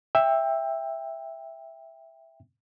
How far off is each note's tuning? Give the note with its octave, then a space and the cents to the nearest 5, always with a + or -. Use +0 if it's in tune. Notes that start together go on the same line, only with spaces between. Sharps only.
E5 +0 G5 +20